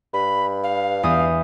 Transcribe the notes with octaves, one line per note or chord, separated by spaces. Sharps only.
G2 B5
F5
E2 D#6